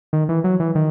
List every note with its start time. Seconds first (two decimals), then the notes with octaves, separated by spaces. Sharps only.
0.13 D#3
0.29 E3
0.44 F#3
0.60 E3
0.75 D#3